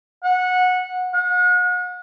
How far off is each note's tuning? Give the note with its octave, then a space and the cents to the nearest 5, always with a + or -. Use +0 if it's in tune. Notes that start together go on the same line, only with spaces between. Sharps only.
F#5 -20
F#5 -40